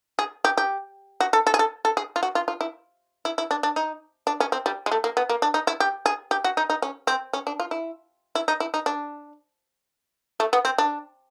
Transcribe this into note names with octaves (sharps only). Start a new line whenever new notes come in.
G#4
G4
G4
F#4
A4
A4
G#4
A4
A4
G#4
F4
F#4
F4
F4
E4
E4
E4
D4
D4
D#4
D4
C#4
C4
G3
G#3
A3
A#3
B3
A#3
D4
D#4
E4
G4
G#4
G4
F#4
D#4
D#4
C#4
C4
C#4
D4
F4
E4
E4
D#4
E4
D#4
D4
A3
B3
C4
D4